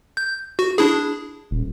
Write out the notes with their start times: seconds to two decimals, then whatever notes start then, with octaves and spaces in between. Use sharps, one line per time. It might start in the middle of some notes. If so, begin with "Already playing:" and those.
0.17 G6
0.59 F#4
0.78 D4 E4 G#4
1.51 D#1